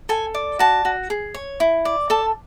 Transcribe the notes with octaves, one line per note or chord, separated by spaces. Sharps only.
A4 G#5
D5
F#4 A5
F#4
G#4
C#5
E4
D5
A4 A5